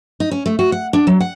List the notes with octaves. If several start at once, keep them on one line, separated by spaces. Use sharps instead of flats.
D#4
C#4
A3
F#4
F#5
D4
F#3
F#5